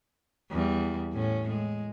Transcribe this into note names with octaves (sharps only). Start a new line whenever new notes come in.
E2 G3
A2 C#4
G#3